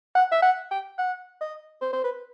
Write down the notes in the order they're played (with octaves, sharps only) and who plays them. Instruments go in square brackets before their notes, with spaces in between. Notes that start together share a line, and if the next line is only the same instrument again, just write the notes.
[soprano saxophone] F#5
E5
F#5
G5
F#5
D#5
C5
C5
B4